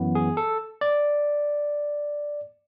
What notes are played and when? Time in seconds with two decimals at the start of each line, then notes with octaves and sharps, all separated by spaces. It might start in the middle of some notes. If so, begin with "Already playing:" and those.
Already playing: F#2 E3 B3
0.15 G#4
0.37 A4
0.81 D5